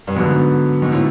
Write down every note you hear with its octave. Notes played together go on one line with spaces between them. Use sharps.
G2
G#2 D3 F#3 B3
G#2
A2